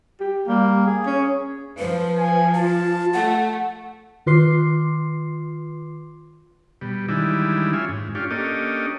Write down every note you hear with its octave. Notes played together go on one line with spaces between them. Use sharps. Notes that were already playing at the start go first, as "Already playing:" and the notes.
G4
G3 A#3
G#4
C#4
F3 B4
G#5
F4 A5
A3 F#5
D#3 F4 B4 C6 D6 C7
B2 G3
D#3 E3 G3 G#3 D4 E4
C#4 F4 E5 G#5
G#2
C#4 D4 F4 G4
A#3 C#4 D4 G4 A4 D#5